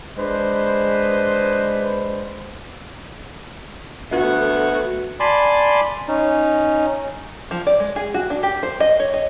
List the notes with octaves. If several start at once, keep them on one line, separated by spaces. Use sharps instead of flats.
G#3 D4 B4 C5
D2 A3 B3 F#4
D5 G#5 A5 B5 C6 D6
C#4 D#4
F3
D5
G#3
G#4
F#4
D4
G4
C5
D#5
C#5
D#5